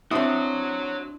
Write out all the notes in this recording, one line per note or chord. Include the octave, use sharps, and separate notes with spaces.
C4 D4 E4 F#4 C#5 C6 D#6